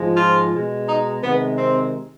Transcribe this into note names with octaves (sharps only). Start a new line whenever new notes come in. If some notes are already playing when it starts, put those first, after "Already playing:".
Already playing: G#2 F3 G#3
F4
B2 G#3
D#4
C3 D#3 G#3 B3
C4